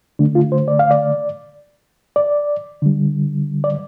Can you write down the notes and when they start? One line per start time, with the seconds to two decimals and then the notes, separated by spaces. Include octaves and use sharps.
0.19 D3 A3 D4
0.35 F4
0.52 C5
0.68 D5
0.79 F5
0.91 D5
2.16 D5
2.82 D3 G3
3.64 D5